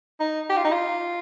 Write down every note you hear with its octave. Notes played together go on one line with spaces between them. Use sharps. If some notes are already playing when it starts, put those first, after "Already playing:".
D#4
G4
F4
D#4
F4